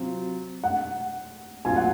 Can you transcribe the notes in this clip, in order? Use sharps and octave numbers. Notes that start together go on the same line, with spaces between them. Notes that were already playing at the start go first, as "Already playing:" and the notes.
Already playing: C3 F#3 C4 F4
F#5
C2 A#2 F#3 C4 F4 G#5
F#5